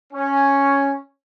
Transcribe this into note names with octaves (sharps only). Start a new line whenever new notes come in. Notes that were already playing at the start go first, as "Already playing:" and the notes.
C#4